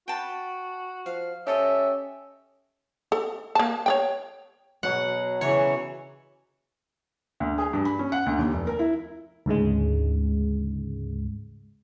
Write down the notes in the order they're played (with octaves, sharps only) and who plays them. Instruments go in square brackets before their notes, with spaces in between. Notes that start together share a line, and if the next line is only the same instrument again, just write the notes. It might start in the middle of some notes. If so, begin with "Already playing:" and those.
[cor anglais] F#4 [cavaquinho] G5 A5 B5
[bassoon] F3 [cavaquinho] F5
[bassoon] C#4 [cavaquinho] G4 A4 D#5 [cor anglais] E5
[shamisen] A4
A#3 A5
C#5 D5 G5
[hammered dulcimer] B2 F#3 G#4 [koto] F#5
[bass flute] C#3 [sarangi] E3 [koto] C#5 [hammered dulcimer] C#6
[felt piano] D2
G#4
G2
B5
C#4
F#5
D2
D#2
F1
A#4
E4
[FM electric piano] D2 G#2 C#3 G#3